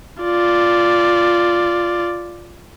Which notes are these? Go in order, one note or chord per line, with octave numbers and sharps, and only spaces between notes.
F4 D5